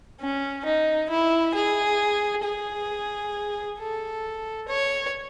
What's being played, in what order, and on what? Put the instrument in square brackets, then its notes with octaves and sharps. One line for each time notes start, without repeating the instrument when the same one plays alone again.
[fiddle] C#4
D#4
E4
G#4
G#4
A4
C#5